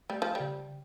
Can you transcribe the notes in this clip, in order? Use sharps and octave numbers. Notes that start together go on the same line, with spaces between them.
G3 A3
F3
C#3 G3